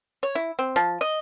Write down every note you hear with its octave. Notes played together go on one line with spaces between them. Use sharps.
C#5
E4
C4
F3
D#5